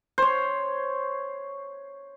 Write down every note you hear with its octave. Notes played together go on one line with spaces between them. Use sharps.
C5 C#5